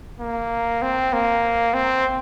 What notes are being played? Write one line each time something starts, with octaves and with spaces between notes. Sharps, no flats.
A#3
C4
A#3
C4